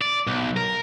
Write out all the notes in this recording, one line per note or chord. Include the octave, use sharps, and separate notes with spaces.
D5
B1
A#4